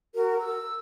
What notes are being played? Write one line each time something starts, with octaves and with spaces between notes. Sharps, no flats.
F#4 A#4
E6